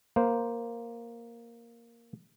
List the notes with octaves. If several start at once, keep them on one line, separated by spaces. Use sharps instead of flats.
A#3 C5